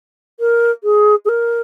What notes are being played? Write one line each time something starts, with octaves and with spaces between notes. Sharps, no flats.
A#4
G#4
G#4
A#4